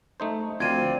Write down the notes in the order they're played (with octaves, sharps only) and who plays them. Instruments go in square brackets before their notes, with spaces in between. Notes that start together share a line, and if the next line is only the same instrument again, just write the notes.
[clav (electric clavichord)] A3 D#4 C5
[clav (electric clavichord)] D2 F3 [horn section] C4 F4 D5 [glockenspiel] G#6 D#7